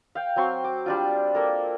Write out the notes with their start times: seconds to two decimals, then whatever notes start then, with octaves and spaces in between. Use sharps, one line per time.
0.15 F5 G5
0.36 F#3 C4 C6 C#6
0.64 D6
0.86 G3 D4 F4
1.34 A#3 A4 A#4